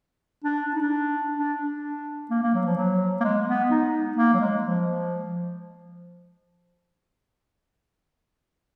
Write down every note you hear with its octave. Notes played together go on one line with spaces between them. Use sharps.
D4
D4
D#4
D4
D4
D4
A#3
A#3
F#3
F3
F#3
A#3
G#3
B3
D#4
A#3
F#3
G#3
F3